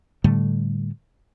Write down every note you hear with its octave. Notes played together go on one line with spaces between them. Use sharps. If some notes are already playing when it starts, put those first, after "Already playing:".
A2 D3 G3 A3